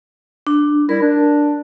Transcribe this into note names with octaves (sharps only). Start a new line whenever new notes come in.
D4
G3 E4 A#4
D4